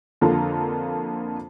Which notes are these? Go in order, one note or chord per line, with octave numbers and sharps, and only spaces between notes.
F2 D3 A#3 F4 A4 A#5